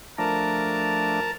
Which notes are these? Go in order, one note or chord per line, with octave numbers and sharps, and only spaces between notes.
F3 A3 D4 A#4 A5 A#5